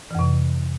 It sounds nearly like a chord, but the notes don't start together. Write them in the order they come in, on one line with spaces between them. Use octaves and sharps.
E3 F2 C3